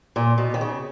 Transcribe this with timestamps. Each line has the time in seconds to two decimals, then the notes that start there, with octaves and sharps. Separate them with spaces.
0.16 A#2
0.38 B2
0.54 D#3
0.61 C#3